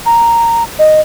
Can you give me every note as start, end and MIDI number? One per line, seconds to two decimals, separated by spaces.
0.06 0.63 82
0.79 1.01 75